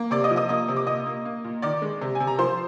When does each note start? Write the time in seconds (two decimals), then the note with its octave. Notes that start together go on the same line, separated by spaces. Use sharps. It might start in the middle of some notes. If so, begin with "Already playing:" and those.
Already playing: A#3
0.11 C3 D5 D6
0.24 D#5 D#6
0.31 F3
0.36 D#5 D#6
0.49 A#3 D#5 D#6
0.69 C3
0.77 D6
0.87 A#2 D#5 D#6
1.06 A#3
1.25 A#3
1.44 A#2
1.62 D#3 D5 D6
1.82 G#3
2.02 C3
2.15 G#5
2.20 C3
2.27 A#5
2.38 F3 C5 C6